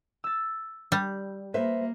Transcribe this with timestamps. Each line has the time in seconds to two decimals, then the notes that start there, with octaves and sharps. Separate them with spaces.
0.24 E6 A6
0.92 G3
1.54 A#3 B4 C5 E5